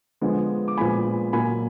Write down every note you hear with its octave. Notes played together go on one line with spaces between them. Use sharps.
D3 F3 G#3 B3
D6
A#2 F3 G#3 B3 G#5 B5
A#2 F#3 A#3 G#5 B5